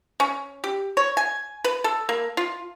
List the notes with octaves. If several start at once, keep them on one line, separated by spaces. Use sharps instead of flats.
C#4
G4
C#5
G#5
B4
A4
A#3
F4